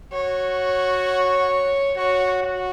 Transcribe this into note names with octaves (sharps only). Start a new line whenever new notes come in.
F#4 C#5
F#4 C#5
F#4